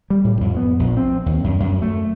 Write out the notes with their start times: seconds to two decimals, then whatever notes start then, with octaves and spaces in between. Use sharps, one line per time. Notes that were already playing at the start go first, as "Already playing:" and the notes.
0.10 G3
0.24 A2
0.41 F2
0.57 B3
0.79 A#1
0.97 C4
1.26 D#2
1.44 F#2
1.60 F#2
1.82 A3